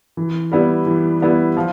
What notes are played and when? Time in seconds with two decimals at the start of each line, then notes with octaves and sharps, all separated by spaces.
0.17 E3
0.52 G3 B3 E4
0.86 E3
1.21 G3 B3 E4
1.57 F3